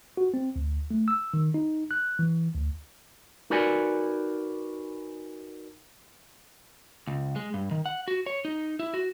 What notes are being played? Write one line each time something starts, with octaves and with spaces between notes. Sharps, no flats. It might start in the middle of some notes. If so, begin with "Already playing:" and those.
F#4
C4
D2
A3
E6
D#3
D#4
F#6
E3
D2
D#4 F#4 A#4 B4 D5 G#5
C#2
G#3
G2
D#3
F#5
F#4
C#5
D#4
E4
F#4